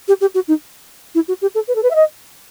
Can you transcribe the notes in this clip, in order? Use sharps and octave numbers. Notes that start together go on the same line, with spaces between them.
G4
G4
F#4
D#4
E4
F#4
G4
A4
B4
A4
B4
E5
D#5